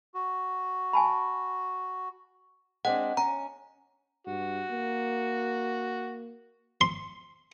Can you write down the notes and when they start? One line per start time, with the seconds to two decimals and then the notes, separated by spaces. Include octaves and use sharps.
0.14 F#4
0.93 G#5 A5 B5
2.85 G#3 C4 D4 F#5
3.17 C#4 A#5
4.27 G2 F#4
4.71 A#3
6.81 C6